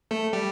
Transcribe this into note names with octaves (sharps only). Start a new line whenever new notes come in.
A3 A4
G3 G4